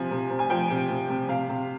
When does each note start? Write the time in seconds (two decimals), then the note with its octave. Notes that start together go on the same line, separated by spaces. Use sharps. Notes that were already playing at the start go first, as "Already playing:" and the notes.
Already playing: C3 F3 G#5
0.11 C3
0.31 C3
0.39 G#5
0.50 F3 G5
0.70 C3
0.90 C3
1.09 C3
1.28 C3 F5
1.49 C3